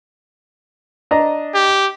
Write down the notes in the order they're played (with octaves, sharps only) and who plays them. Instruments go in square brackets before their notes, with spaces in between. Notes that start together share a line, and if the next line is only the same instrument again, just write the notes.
[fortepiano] D4 D#5 A#5
[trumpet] G4